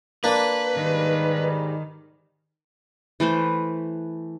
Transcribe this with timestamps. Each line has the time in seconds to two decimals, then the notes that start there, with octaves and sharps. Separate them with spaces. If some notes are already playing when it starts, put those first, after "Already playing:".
0.24 A#3 D4 B4
0.75 G#2 D#3 G3
3.20 E3 A3 B4 C5